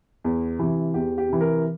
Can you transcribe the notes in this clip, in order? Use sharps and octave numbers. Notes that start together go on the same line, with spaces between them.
E2
C3 E3
E2 G4
G4
C3 E3
A#4